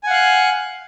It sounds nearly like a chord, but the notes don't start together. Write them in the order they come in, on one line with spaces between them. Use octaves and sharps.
G#5 F#5 F5 F#6